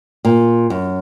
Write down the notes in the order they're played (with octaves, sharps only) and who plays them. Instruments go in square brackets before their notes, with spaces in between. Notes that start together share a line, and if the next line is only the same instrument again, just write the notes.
[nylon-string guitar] A#2
F#2